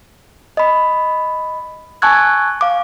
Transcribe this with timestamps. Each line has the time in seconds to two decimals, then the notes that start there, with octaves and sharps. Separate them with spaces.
0.57 D#5 B5
2.02 G#5 A5 C#6 E6 F#6 G#6
2.61 F5 D6